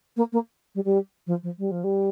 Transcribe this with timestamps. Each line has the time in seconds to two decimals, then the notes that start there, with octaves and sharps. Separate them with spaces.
0.17 A#3
0.32 A#3
0.75 G3
0.85 G3
1.27 F3
1.43 F3
1.58 G3
1.71 F3
1.84 G3